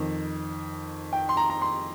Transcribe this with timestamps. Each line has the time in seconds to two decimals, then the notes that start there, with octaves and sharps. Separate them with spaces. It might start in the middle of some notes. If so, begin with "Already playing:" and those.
Already playing: F2 D#3
1.13 G5
1.29 C6
1.37 A#5
1.50 A#5
1.62 C6